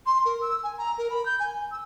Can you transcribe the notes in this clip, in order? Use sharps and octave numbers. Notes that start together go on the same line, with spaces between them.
C6
A#4
E6
G#5
A#5
A#4
B5
G6
G#5
E6